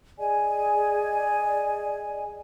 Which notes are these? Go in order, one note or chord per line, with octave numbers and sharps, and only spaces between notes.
G#4 D5 D#5 G#5